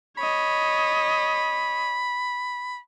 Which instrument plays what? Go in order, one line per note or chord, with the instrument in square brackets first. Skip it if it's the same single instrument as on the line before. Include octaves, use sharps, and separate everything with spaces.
[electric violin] C#5 D#5 [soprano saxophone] B5